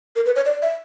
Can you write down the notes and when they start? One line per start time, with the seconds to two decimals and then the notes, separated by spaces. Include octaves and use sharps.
0.16 A#4
0.26 B4
0.36 C#5
0.45 D5
0.62 E5